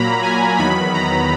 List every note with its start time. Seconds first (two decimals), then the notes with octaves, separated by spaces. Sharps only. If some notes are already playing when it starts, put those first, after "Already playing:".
Already playing: A#2 F#3 A#3 A#5 B5
0.23 G#5
0.58 E2 D#3 F#3 B3 B5
0.94 A#5